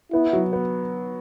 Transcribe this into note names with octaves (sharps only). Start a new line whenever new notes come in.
B3 E4
F#3
B3